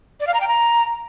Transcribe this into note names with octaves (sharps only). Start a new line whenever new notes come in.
D5
F5
A#5
G5
A#5